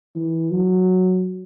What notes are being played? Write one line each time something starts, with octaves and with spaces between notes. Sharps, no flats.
E3
F#3